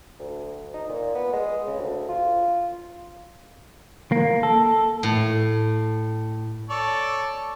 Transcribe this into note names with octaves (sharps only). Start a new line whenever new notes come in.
D2
D#4
A#2
B3
G#3
C#3
D2
F4
A#3
A4
A2
A4 C#5 D5